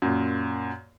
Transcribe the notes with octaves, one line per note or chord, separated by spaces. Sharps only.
F#2 A#2